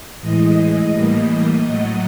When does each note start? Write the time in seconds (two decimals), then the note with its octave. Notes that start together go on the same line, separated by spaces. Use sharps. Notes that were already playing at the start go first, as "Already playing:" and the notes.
0.21 A2 E3 G#3 D#5
0.92 A2 E3 G3 A#3
1.63 A2 F#3 A3